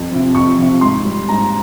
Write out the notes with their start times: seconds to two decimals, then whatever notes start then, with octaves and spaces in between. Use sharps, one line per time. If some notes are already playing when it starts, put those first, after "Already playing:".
Already playing: F2
0.11 C3 F3
0.35 F2 C#6
0.58 C3 F3
0.81 G#2 C6
1.05 G3
1.29 G#2 A#5